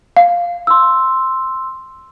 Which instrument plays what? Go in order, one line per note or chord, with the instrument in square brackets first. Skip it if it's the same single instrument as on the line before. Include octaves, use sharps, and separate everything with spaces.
[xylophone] F5
[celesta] C6 E6